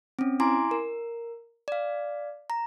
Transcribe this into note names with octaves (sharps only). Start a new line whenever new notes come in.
C4 C#4
E4 G#5 A#5 C6 D6
A#4
D5 F5
A#5